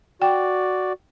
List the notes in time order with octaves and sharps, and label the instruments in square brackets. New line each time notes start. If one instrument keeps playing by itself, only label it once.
[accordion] F#4 D5 [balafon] G5